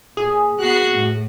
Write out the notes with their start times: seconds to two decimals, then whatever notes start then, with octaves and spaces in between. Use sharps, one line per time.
0.17 A#2 G#4
0.59 B3 F#4 F#6 C7
0.95 A2